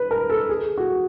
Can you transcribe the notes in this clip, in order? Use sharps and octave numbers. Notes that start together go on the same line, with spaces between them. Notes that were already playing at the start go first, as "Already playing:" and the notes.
Already playing: B4
A#4
A4
G#4
F#4